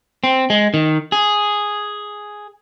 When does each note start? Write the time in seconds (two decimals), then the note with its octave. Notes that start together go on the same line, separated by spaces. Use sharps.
0.24 C4
0.50 G#3
0.74 D#3
1.12 G#4